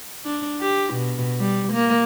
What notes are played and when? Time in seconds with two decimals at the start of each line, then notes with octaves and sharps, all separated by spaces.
0.25 D4
0.61 G4
0.93 B2
1.39 G3
1.73 A#3